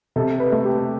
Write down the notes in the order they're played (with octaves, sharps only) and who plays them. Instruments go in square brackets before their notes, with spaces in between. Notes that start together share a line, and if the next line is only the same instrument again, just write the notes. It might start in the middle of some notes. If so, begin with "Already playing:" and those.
[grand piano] C3 [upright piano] A4
[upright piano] B4
[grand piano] A3
[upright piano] G4